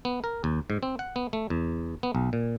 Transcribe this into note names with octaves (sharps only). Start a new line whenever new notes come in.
B3
A#4
D#2
G#2
C4
F#5
B3
A3
E2
B3
B1
A#2